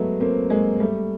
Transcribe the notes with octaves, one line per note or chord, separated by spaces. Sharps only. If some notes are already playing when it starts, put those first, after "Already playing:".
Already playing: F#3 G#3 A3 B3
A#3 C4
G#3 A#3
G3 A3